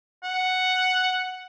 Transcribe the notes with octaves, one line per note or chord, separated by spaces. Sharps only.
F#5